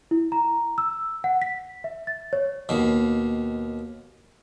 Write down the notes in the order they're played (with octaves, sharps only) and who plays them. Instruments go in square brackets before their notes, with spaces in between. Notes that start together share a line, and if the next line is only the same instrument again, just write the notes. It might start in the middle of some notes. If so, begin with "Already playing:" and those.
[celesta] E4
A#5
E6
F#5
B6
E5
A6
C#5
[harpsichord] D#2 B2